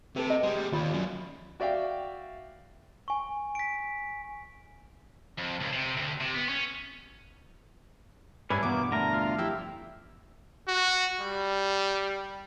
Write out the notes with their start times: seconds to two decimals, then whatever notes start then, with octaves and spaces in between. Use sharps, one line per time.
0.16 C3 A4 B4
0.30 D#5
0.43 G3 G#3 A#4
0.72 D#2 F4 D5 B5
0.93 F#2
1.60 F#4 D5 E5 F5 G5
3.08 G#5 C#6
3.55 B6 D7
5.38 F2
5.61 C#2
5.73 C3
5.97 D2
6.21 C3
6.34 B3
6.49 C#4
8.50 G2 C#4 D4 E4 B4 G#5
8.63 E2 G2 B2 E3 A#3 B3 D6
8.92 D3 A3 A#4 A#5
9.13 F4
9.38 F2 E4 G4
10.68 F#4
11.21 G3